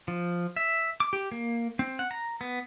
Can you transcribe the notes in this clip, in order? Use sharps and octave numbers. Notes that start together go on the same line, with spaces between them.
F3
E5
D6
G4
A#3
C4
F#5
A#5
B3